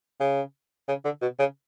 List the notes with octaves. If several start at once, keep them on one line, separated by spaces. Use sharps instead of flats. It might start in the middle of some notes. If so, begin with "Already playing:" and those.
C#3
C#3
D3
B2
C#3